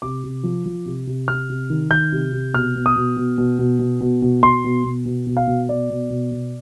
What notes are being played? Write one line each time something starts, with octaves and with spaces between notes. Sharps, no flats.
C3 D6
C3
F3
F3
C3
C3
C3 F6
C3
D#3
D#3 G6
C3
C3
B2 F6
B2
D#6
B2
B2
B2
B2
B2
B2
B2
B2 C6
B2
B2
B2
B2
F5
B2
B2 D5
B2
B2
B2